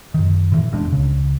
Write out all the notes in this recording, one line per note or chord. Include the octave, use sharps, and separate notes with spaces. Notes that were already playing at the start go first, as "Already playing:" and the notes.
F#2 D#3
A#2 D#3 E3
F1 E2 G#3 D4
C#2 C#3